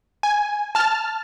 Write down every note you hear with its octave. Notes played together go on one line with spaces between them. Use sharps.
G#5
A5 F6